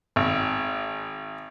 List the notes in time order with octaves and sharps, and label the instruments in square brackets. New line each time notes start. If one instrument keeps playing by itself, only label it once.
[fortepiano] G#1